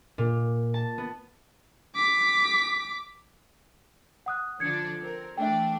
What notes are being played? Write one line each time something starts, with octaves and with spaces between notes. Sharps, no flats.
A#2
A5
B3
D6 B6
F#5 D#6 F#6
D3 F3 D4 G#6 C#7
C4 A#4
E3 A3 D4 E5 G5